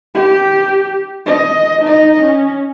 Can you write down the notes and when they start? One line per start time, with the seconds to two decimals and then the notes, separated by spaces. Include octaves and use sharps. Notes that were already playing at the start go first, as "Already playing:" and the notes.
0.15 G4
1.26 D#5
1.82 D#4 D#5
2.21 C#4